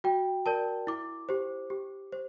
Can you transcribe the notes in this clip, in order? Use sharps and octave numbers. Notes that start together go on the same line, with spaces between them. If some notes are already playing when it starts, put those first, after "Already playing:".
F#4 G5
A#4 D5 A5
E4 D6
G4 C5
G4
C5